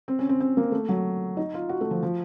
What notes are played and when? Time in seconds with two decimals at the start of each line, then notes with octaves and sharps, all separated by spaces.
0.08 C4
0.19 C#4
0.29 C4
0.40 C4
0.57 A#3
0.72 A3
0.89 F#3
1.37 D#4
1.54 F4
1.69 F#4
1.81 A3
1.91 F3
2.03 F3